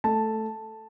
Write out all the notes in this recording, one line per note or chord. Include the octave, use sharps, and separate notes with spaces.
A3 A5